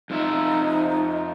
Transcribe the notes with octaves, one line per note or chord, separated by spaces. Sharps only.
F2 D#4 F4 E5